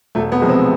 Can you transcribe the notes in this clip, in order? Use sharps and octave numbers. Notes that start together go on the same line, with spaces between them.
E1 A3
B3
E2 C3 F3 G#3
C4